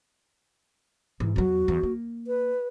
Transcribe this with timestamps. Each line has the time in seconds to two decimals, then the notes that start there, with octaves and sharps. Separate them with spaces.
1.20 G#2 E3
1.36 E2 F#3 F#4
1.68 E2
1.83 A#3
2.27 B4